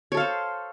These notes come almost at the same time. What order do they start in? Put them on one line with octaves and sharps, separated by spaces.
C#5 A4 F5 C5